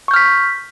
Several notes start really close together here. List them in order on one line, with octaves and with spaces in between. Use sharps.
C#6 G6 F6 B6